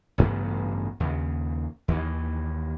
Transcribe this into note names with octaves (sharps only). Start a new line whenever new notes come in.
A1 G2 C#3 B3
D#2 C#3
D#2 D#3 E3